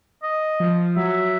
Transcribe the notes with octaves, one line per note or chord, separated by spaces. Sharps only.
D#5
F3
F#3 E5